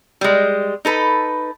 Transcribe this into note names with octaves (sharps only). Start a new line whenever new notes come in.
G3 G#3
D#4 A4 B4